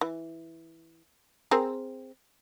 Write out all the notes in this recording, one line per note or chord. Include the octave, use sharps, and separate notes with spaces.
E3
C4 G#4 A#4